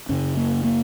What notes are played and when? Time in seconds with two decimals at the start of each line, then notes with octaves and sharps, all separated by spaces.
0.09 F#2 C#3 C#4
0.37 A#3
0.64 A#3